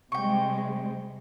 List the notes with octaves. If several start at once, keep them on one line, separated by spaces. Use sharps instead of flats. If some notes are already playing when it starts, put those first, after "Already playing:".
C3 G3 G#3 G5 C#6